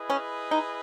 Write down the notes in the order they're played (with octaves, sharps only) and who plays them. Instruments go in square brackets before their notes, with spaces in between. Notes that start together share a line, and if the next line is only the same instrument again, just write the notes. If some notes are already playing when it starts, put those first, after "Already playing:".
Already playing: [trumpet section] E4 G#4 B4 D#5
[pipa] C#4
D#4